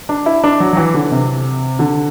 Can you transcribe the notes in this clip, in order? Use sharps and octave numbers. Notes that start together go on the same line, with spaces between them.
D4
E4
D4
F#3
F#3
E3
D3
C3
D3